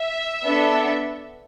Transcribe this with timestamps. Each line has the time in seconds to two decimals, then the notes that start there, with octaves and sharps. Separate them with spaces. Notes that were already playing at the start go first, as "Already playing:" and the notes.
Already playing: E5
0.44 B3 D4 A4